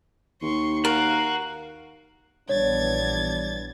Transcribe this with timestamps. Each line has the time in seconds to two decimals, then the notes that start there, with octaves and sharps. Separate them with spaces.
0.42 D#2 C6 C#6
0.85 F#4 A#4 F5
2.49 A#1 E3 G3 B3 D4 C#5 G#6 A6